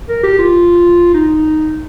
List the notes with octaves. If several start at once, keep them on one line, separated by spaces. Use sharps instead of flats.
A#4
G4
F4
D#4